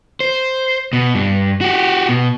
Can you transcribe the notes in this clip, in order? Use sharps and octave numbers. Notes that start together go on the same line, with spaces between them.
C5
B2
G2
F#4 G4
B2